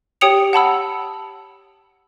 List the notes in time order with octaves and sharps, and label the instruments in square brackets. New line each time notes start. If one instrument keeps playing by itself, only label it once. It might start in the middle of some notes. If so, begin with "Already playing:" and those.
[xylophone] G4 C#5 G5 D#6 C#7 F7
F#5 A5 B5 E6